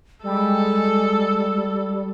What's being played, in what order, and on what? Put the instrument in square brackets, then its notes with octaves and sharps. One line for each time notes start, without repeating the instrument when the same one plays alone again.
[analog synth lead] G3 [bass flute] G#3 [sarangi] A4